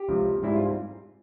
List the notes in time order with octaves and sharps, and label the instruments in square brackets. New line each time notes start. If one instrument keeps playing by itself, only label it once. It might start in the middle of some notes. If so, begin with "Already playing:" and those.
Already playing: [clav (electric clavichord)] G4
C#2 C3 F3
G#2 G3 C4 E4
F4